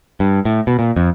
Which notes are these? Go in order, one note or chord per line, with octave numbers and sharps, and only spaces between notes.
G2
A2
B2
A#2
F2